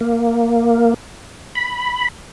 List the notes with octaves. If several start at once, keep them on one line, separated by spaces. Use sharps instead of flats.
A#3
B5